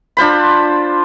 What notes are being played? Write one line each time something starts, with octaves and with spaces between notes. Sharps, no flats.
D4 F4 C5 B5